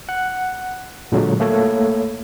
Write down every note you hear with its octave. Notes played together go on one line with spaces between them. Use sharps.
F#5
A#2 D3 F#3 G#3
A3 A#3 A4 C#5